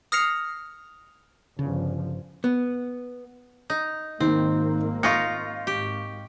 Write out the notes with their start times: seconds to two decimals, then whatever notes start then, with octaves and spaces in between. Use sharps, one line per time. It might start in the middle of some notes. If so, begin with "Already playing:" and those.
0.12 D#6 F6 A#6 C7 C#7 F7
1.59 G1 C#3 F3
2.44 B3
3.70 D#4
4.20 G#1 D#3 A#3 C4
5.03 D#4 F4 C#6 A#6 C#7
5.67 G#1 G4